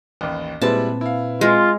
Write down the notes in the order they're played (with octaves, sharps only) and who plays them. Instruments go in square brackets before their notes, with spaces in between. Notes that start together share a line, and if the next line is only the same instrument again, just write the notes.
[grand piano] A1 D#2
[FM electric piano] A#2 C4 B4 [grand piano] G3 G#3 E4 [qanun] A5
[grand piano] E4 F5
[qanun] G#3 [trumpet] F4